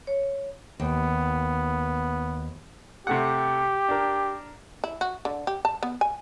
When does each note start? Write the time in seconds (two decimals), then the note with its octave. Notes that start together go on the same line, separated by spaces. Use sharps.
0.07 C#5
0.80 D#2 B3
3.07 C3 A3 G4 F#5
3.89 D4 A#4
4.84 E4
5.01 F#4
5.25 D3
5.47 G4
5.65 A5
5.83 B3
6.01 G#5